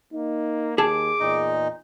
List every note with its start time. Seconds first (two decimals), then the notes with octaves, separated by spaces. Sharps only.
0.13 A#3 D#4
0.78 D#2 G#4 A5 D6
1.20 E2 A#2 D#4 D#5